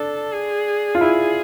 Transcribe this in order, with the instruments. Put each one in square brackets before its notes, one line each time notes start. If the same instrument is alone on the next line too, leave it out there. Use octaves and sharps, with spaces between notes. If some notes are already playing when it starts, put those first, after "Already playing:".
Already playing: [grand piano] D4 [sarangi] A4
[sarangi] G#4
[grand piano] F4
[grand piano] E4 [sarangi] G#4